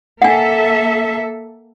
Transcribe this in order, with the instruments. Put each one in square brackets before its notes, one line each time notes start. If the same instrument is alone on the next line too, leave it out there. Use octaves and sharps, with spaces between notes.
[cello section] A#3 A4 E5 [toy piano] F#5 G#5